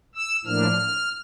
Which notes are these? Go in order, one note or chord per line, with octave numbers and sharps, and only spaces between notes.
E6
A2 F3 A#3 D4 F6